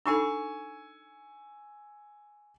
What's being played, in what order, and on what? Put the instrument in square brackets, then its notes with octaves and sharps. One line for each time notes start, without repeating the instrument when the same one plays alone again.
[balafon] D4 D#4 A4 [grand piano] G#5 C#6 E6